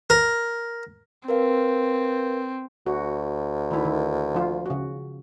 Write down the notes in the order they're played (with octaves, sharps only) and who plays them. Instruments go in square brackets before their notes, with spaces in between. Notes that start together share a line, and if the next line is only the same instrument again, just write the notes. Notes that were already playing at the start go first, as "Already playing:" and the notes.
[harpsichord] A#4
[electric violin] C4 [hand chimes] A#4 B4 F5
[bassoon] D2 [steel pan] F#4
[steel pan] D#3 E4
D#3
F3 F4
C#3 F#4